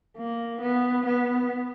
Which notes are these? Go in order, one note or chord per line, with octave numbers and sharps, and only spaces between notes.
A#3
B3
B3